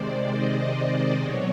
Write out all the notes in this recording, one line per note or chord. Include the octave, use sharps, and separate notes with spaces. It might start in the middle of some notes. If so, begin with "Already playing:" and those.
Already playing: C3 D#3 G#3 C5 D5
D#5
D5
B2 F#3 C#5